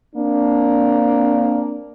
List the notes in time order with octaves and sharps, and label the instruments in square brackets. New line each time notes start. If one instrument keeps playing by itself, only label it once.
[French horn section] A#3 C4 D4